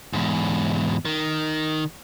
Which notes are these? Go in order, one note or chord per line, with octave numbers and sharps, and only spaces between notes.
E2 G#2
D#3